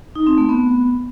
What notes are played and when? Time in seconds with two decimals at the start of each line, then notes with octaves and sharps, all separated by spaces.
0.15 D#4
0.27 C4
0.38 A3
0.49 B3